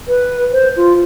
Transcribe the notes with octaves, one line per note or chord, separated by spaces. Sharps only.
B4
C5
F4